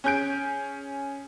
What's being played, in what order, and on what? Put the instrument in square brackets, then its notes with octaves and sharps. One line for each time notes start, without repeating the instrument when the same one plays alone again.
[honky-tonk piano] C#4 G#4 G6 D7